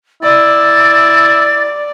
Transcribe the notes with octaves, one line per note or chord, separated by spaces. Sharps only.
E4 D5 A6